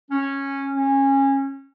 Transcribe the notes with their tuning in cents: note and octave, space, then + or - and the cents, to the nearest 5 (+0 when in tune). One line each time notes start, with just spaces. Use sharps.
C#4 -10
C#4 -20